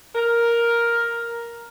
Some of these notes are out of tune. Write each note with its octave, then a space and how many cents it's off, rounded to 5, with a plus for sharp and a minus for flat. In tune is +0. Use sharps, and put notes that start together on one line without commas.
A#4 +5